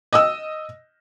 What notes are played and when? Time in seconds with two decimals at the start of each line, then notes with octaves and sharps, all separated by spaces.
0.13 D#5 D#6 E6